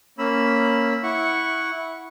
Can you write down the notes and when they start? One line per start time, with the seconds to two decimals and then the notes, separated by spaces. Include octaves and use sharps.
0.18 A#3 C#4 B5 E6
1.03 E4 F#5 C#6